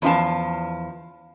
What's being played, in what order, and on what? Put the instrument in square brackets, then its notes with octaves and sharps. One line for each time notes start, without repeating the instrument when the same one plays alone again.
[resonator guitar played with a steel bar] E2 F3 E4 F5 A5